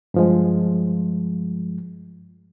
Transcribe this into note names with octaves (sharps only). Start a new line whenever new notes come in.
G2 F3 G#3